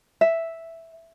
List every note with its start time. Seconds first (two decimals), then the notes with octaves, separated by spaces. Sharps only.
0.21 E5